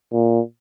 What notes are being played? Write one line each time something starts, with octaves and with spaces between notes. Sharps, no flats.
A#2